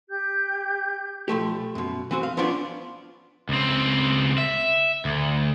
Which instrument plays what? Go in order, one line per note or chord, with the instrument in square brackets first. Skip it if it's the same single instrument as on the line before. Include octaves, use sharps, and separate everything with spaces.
[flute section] G4 G6
[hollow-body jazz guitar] B1 F3 A3 G4
F#2 B2
E3 C4 F#4
F5
F3 B3 C#4 D4 F4 D5
[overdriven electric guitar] C#2 C4
E5
D2